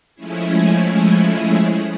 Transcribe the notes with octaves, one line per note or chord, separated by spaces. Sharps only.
F3 G#3 A3 C#4 E4 G#4